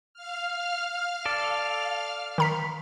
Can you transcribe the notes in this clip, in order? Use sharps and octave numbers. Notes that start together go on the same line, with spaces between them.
F5 F6
A4 D5
D#3 A#5 B6